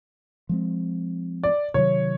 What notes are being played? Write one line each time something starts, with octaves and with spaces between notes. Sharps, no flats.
F3 G#3 C4
D5
C3 D#3 F#3 C#5